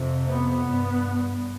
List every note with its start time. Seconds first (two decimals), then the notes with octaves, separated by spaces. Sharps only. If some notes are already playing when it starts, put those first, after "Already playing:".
Already playing: F2 C3
0.30 B3
0.70 G2